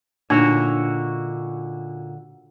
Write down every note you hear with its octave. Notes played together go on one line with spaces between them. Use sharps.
A#2 D3 D4 D#4 F#4 C#5